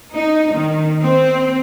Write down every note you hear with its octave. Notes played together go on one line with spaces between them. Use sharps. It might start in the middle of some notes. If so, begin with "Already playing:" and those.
D#4
D#3
C4